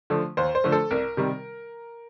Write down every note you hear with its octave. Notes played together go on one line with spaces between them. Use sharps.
D3 F3 A3
D#2 C5
C5
D3 F3 A3
A4
C2 A#4
C3 D#3 G3